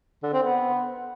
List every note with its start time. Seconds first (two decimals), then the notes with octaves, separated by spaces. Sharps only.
0.23 D3
0.33 C4
0.43 B3